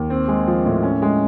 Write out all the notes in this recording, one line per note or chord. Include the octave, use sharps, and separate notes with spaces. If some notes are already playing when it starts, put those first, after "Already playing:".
Already playing: D#2
C4
G#3
F3
A2
C#4
G#3